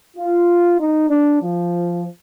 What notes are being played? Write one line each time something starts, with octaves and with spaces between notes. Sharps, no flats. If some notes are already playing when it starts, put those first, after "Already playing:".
F4
D#4
D4
F3